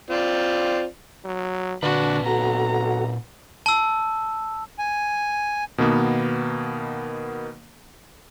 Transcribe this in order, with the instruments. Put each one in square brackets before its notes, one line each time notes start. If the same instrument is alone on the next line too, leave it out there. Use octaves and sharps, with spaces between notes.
[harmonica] C4 F4 D5
[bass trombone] F#3
[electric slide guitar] A#2 B4 [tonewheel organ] D3 [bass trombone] D4 [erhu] F#4
[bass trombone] B1 [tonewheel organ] F#4 A4 F#5 [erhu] A#5
[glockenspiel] A5 E6
[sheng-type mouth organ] G#5
[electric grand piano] B2 D#3 A#3 B3